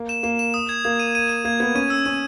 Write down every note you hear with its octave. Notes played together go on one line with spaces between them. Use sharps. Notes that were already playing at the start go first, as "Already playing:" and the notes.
Already playing: A#3
E7
A#3 E7
E7
D#6
G#6
A#3 G#6
D#7
D#7
D#7
A#3 G#6
B3 G#6
C#4 D#7
E6
C#4 D#7